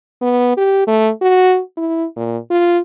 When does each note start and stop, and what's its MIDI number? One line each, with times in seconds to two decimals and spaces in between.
0.22 0.56 59
0.57 0.86 67
0.87 1.10 57
1.22 1.60 66
1.77 2.05 64
2.16 2.38 46
2.50 2.80 65